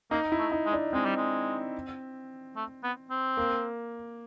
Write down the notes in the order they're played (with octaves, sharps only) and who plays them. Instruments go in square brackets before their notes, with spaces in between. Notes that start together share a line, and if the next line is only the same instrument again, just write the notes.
[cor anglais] A#3 [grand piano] D#4
[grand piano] E4
[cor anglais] A3
[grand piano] D#4
[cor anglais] G#3
[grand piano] D4
[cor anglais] G#3 [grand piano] C4
[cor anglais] G3
G#3
A3
B3
C4
[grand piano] A#3